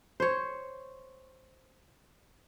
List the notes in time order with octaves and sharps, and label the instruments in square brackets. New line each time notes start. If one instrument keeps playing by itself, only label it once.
[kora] C5 C#5